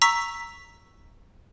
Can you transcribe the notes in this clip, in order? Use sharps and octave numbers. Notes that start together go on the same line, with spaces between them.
A#5 C#6 E6 B6